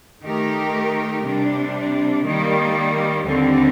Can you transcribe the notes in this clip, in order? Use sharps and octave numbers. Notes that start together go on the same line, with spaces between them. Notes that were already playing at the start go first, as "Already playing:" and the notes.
D#3 A3 D#4 G4 A#4
C3 G3 D4
D#3 G3 A#3
D#2 D3 G3 C4